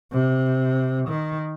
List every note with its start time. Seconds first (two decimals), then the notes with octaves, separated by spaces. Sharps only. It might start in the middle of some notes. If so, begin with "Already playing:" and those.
0.13 C3
1.08 D#3